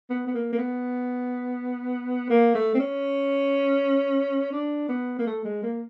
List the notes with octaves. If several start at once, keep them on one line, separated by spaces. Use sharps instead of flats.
B3
B3
A#3
A#3
B3
A#3
A3
C4
C#4
D4
B3
A#3
A3
G#3
A#3